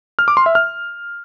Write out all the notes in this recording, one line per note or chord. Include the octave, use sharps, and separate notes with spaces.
F6
D6
C6
E5
F6